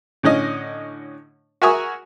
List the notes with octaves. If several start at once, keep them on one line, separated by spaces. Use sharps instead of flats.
A2 D3 C#4 D#5
F#4 A#4 E5 G#5 C#6 D#6